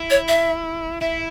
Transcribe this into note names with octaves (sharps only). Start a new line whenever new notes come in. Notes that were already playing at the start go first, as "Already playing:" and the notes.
Already playing: E4
C#5
E5
E4 E5